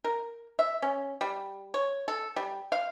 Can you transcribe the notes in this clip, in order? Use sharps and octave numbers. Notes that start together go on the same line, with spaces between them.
A#4
E5
C#4
G3
C#5
A4
G3
F5